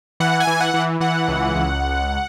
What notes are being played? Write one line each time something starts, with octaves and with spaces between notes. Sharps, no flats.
E3 F#5
G#5
E3
F#5
E3
E3 F#5
C#2
C#2